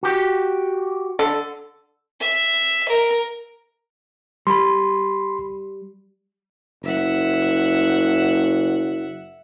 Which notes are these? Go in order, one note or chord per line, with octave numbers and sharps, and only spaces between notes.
F#4 G4
D3 A4
E5
A#4
G3 B5 C6
F#1 E5 F#5